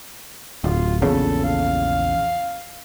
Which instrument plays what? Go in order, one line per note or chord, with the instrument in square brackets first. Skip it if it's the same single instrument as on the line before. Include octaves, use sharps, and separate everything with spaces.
[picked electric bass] D1 [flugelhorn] F4
[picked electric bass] A#1 E2 C#3 [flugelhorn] A4
[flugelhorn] F5